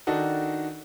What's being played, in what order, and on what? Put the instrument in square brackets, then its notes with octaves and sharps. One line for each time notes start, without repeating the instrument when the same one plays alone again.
[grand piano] D#3 D4 D#4 F#4 A4